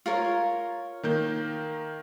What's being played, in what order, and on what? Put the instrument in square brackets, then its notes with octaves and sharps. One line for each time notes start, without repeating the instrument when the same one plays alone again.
[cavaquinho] F4 A#4 C#5
[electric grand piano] D#3 A#3 G6